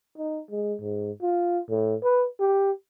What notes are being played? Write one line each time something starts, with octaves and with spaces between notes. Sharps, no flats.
D#4
G#3
G#2
F4
A2
B4
G4